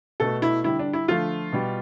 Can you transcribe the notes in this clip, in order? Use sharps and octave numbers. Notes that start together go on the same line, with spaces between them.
B2 A3 A4
E4
D3 G3 E4
D4
E4
D3 F3 A3 F4
B2 G3